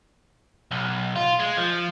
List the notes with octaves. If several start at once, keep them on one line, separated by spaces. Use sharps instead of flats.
B1
F4
G#3
F3